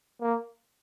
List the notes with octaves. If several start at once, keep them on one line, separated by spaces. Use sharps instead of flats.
A#3